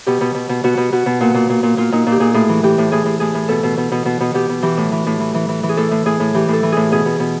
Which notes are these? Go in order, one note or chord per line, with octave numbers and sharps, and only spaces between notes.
B2 G4
B2
B2
B2
B2 F#4
B2
B2 F#4
B2
A#2 F#4
A#2
A#2
A#2
A#2 F4
A#2 D#4
A#2
G4
A#2 G#4
A2 G#4
E3
E3 G4
A2
A2 G#4
A2
A2 G#4
A2
B2 A4
B2
B2
B2
B2
B2
B2 G4
B2
E3 G4
A2
E3
A2
E3
E3
E3
E3
G#4
A2 A4
A2
A2 G#4
A2
E3 G4
A2 A4
E3
A2 G#4
B2 G#4
B2
B2